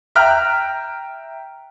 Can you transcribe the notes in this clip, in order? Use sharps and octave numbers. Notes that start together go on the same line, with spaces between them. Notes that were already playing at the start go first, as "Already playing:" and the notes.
E5 G5 A#5 F6 F#6